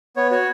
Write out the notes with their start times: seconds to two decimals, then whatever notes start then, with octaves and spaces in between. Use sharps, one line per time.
0.16 B3 C#5
0.31 F#4 C#5